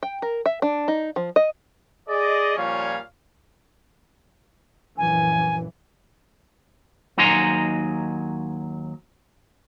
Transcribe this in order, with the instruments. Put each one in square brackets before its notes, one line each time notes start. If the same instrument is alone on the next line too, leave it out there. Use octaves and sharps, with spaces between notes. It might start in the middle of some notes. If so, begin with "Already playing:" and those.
[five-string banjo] G5
A#4
E5
D4
D#4
F3
D#5
[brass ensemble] G#4 D5 D#5
A#2 F3 G3 C#4 C#5 F5
[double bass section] A#1 F#2 E3 [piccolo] G#5
[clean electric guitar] D#2 F#3 D#4 G#5 A#5 C6